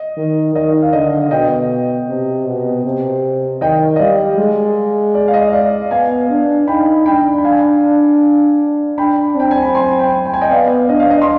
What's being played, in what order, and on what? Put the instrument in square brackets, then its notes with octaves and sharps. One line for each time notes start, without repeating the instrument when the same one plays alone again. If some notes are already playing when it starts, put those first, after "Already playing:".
Already playing: [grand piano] D#5
[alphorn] D#3
[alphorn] D#3 [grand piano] D#5
[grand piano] F5
[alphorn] D3 [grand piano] D#5
[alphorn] B2 [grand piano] D#5 G5
[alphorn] C3
B2
C3
[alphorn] D#3 [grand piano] D#5 G5
[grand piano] D#5
[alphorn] G3 [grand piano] D5 F5
[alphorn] G#3
[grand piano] D5
F5
D#5
D5 F5
[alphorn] B3 [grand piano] F5 G#5
[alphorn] D4
[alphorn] D#4 [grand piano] G5 B5
[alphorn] D4 [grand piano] G5 B5
[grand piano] B5
F5 G#5
[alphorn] D4 [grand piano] G5 B5
[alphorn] C4 [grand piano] G5
[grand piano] G#5
B5
G#5 C6
G5 B5
G5
G#5
D#5 G5
[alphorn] B3 [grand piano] D5 F5
[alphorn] D4 [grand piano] D#5
[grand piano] F5
D#5
C6